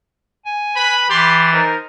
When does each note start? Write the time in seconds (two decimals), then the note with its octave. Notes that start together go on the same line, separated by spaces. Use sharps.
0.45 G#5
0.75 B4 B5
1.10 E3 G4 B5 C6 A6
1.52 D#4 A#4 C5